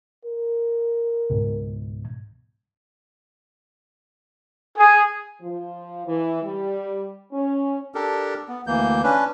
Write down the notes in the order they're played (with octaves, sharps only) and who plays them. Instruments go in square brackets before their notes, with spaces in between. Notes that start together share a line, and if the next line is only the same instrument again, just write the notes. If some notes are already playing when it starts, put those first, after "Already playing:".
[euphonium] A#4
[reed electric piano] C#2 G#2 B2
[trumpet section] G#4
[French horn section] F3
E3
G3
C#4
[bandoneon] D4 G4 A4 A#4
B3
D2 E3 A#3 G6
C#4 D4 B4